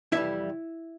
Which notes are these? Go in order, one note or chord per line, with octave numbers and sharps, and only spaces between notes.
F2 C3 E3 G3 E4 E5